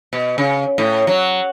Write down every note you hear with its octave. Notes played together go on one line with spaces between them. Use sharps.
B2
C#3
A2
F#3